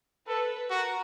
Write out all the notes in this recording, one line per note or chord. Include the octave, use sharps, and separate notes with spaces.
A4 B4
F#4 A#4